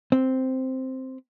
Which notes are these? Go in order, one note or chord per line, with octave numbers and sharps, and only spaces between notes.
C4